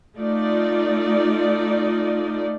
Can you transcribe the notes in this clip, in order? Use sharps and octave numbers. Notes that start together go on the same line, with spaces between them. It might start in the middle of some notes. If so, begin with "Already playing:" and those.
A3 D#4 F4 D5